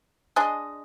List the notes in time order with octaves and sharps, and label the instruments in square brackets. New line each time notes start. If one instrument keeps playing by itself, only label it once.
[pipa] G#3 D4 G#4 D#5